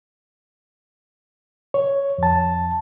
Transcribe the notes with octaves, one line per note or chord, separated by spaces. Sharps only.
C#5
F2 A5